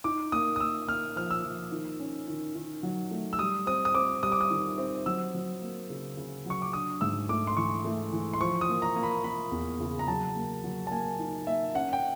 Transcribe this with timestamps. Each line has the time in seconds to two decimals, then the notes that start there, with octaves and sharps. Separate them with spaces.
0.04 D#4 D6
0.32 A#3 D#6
0.56 D#6
0.60 A#3 E6
0.88 A#3 F6
1.16 F3 F6
1.31 E6
1.44 F3
1.72 D#3
2.00 C#4
2.28 D#3
2.56 D#3
2.83 F#3
3.11 A3
3.33 E6
3.39 G3 D#6
3.67 C4 D#6
3.85 D#6
3.95 C4 D6
4.23 G3 D#6
4.32 D6
4.41 D#6
4.50 D#3
4.78 C4
5.06 F#3 E6
5.35 F#3
5.62 A#3
5.90 C#3
6.17 C#3
6.46 F#3 C#6
6.62 D6
6.73 D4 D#6
7.01 G#2 E6
7.29 A3 D6
7.47 C6
7.57 E3 C#6
7.85 A3
8.12 E3
8.33 C6
8.41 F3 C#6
8.61 D#6
8.69 A#3
8.82 A#5
8.96 A#3
9.03 B5
9.24 A#3 B5
9.52 E2
9.80 C#3
9.99 A#5
10.08 F#3 A5
10.36 A#3
10.64 F#3
10.87 A5
10.91 A#3 G#5
11.19 D#4
11.47 A#3 E5
11.75 C#4 F#5
11.93 G5